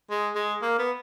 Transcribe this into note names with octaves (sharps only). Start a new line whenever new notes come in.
G#3
G#3
A#3
B3